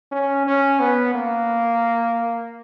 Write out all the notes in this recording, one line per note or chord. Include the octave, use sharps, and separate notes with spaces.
C#4
C#4
B3
A#3